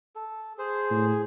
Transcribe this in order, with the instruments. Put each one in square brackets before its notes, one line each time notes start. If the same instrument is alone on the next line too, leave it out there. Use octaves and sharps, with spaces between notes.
[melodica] A4
[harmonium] G#4 [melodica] C5
[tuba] A2